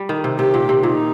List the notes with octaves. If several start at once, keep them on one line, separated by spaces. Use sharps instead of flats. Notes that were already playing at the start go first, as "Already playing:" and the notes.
Already playing: G3
D#3
C3
C3 G4
A#2
C3
A#2 D#4